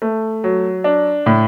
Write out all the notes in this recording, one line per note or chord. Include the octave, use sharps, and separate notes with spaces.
A3
F#3
D4
A2